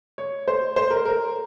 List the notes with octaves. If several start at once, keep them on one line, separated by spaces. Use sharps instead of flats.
C#5
C5
C5
A#4
A#4